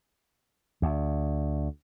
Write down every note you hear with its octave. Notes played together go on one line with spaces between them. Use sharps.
D2